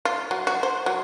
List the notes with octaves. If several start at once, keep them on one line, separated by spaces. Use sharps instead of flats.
F4
F#3
F#4
C5
F#3